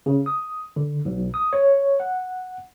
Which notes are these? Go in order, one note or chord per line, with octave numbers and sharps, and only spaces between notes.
C#3
D#6
D3
B1
D#6
C#5
F#5